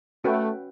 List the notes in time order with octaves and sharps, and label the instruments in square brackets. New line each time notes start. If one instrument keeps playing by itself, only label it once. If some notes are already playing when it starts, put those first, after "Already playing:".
[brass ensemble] A3 [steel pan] C#4 F#4 B4 E5 G5